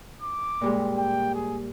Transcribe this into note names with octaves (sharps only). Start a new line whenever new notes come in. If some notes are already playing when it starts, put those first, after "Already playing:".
D6
A#2 G3 G#3
G5
G#4